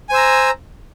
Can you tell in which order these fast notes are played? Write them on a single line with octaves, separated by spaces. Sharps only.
G#5 C5 E6 A#5